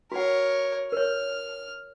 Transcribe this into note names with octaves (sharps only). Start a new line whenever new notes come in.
F#4 A#4 C#5 F#5
A#4 C#5 F6